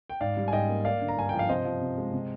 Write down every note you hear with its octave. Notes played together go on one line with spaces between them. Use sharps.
G5
G#2 D5 F5
G3
G#5
G#2 D#5 G5
A#3
A#3 D5 F5
D3
A#5
G2 G#5
F3 G5
F5
C3 C5 D#5
F3
C3
G#3
C3